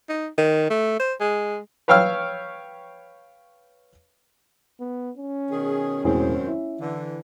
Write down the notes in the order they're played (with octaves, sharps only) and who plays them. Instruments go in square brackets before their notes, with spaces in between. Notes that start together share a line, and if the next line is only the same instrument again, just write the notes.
[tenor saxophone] D#4
D#3
A3
C5
G#3
[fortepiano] B4 C#5 F5 G5 E6 F6
[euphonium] B3
C#4
[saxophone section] B2 D#3 G#4
[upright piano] E1 A2 G#4 [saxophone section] F#2 D#3 C4
[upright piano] E4
[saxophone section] D3 E3